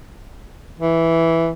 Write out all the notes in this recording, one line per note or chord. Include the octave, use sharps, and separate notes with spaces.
E3